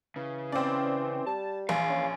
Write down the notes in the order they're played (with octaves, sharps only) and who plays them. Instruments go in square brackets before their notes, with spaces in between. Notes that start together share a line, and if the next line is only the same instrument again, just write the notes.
[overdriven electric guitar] C#3 [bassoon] E3
[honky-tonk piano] C4 D5 [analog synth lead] C#4
[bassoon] G3 [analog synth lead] A5
[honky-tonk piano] A#1 [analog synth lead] E3 [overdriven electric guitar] F5
[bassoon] C#4